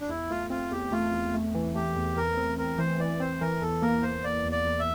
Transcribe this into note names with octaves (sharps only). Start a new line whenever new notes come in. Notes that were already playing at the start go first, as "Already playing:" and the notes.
D4
E2 E4
A3 F4
C4 F4
E2 G4
A3 F4
E2
A3
E3
A3 G4
E2
E3 A#4
C4
C4 A#4
E3 C5
E3 D5
C4 C5
E3 A#4
E2 A4
A#3 A#4
A#3 C5
A#3 D5
E2
D5
E2
E5